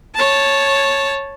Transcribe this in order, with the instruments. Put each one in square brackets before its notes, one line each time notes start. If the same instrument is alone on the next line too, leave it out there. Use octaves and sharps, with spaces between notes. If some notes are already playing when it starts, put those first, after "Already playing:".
[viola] C#5 A5